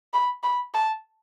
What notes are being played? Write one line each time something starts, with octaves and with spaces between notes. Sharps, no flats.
B5
B5
A5